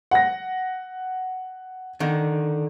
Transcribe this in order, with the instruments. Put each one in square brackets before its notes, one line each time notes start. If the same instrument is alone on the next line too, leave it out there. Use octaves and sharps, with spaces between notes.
[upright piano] F#5 A#6
[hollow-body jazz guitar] D3 D#3